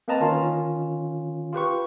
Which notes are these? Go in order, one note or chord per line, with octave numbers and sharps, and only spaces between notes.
A#3 C4 B4 D#5 A5 A#5
D#3 C#4 F4
F4 G4 B4 C#6